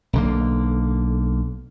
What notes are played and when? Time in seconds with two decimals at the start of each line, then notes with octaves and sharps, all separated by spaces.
0.13 B1 D3 A#3